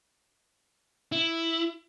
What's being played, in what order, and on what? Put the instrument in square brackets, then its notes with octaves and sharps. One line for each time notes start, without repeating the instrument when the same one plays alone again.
[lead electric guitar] E4